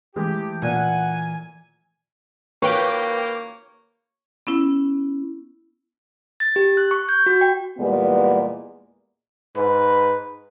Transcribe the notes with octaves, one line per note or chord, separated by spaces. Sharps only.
E3 G#3 A3 G4
A#2 F#5 G#5
A#3 B4 C#5 G5 D6
B3 C#4 E4
A6
G4
F#6
C#6
G6
F#4
G5
E2 A#2 G3 G#3 B3
G#2 B4